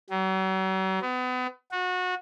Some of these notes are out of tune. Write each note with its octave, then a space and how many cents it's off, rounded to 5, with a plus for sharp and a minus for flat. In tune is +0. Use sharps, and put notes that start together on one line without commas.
F#3 +40
B3 +35
F#4 -25